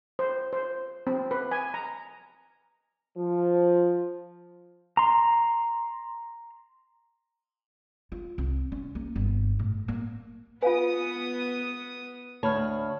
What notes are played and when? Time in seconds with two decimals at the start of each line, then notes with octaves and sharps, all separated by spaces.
0.19 C5
0.53 C5
1.07 C4
1.31 B4
1.51 G#5
1.74 A#5
3.18 F3
4.97 A#5 C6
8.12 F4
8.38 C2
8.72 C#4
8.95 A#3
9.16 G1
9.59 A2
9.88 A#3
10.62 B3 F4 B4 F5 G#5 D#6
12.43 D2 C#5 A5 B5 F6